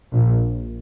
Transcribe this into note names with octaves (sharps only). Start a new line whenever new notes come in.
A#1 A#2